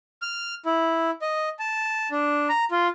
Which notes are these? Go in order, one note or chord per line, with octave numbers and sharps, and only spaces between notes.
F6
E4
D#5
A5
D4
A#5
F4